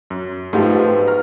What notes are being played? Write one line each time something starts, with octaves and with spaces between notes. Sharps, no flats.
F#2
G#2 B2 F3 A3 C4 D#4 F4 G4
A#5 F6